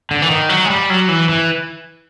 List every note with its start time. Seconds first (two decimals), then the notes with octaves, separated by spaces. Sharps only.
0.11 D3
0.22 E3
0.30 D#3
0.49 F#3
0.65 G#3
0.70 G3
0.90 F#3
1.09 E3
1.29 E3